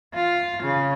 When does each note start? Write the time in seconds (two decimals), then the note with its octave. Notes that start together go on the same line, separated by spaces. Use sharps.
0.15 F4
0.63 C#3